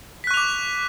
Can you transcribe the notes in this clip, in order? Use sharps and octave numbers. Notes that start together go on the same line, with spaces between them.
C#6 D6 F#6 B6 F7